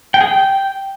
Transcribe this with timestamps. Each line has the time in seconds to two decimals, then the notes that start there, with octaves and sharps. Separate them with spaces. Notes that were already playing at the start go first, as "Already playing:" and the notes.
0.14 G5
0.21 G#4
0.27 G5